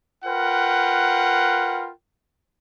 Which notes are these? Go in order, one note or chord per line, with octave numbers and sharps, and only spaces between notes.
F4 A#4 B4 F#5 G5